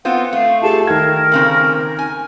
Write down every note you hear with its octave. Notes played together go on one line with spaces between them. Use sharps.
B3 C4 F4 F#5
A3 F5
F4 G4 G#4 A5
D#3 A#4 G5 G#6
A#2 C#3 C4
G#5